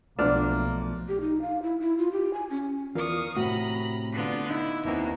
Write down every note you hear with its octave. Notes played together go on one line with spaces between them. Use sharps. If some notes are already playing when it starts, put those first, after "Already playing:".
B1 F3 A3 A#3 D4 F#4 F6
G4
D#4
F5
E4
E4
F4
G4
G#5
C#4
E2 F4 A#4 D5 F5 C#6 D#6
A2 C3 C4 F#4 A#5 B5
D3 B3 F4
D#4 E4
D#2 B2 A#3 C4 E4